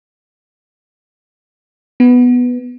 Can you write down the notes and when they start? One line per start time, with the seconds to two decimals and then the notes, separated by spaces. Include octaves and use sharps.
2.00 B3